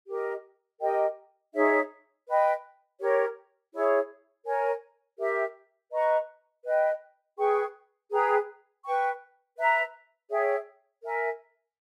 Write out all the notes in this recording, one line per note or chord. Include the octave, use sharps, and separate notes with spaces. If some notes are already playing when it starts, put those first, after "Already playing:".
G4 A#4 D#5
G4 A#4 D#5 G5
D#4 G#4 C#5 E5
B4 D#5 G5
G4 A#4 C#5
E4 G#4 C#5
A#4 C#5 G#5
G4 A#4 E5
B4 D#5 A#5 C#6
B4 D#5 G5
G#4 B4 G5 C#6
G#4 B4 G5 A#5
B4 G5 C#6
B4 E5 A#5
G#4 C#5 E5 G5
A#4 E5 G#5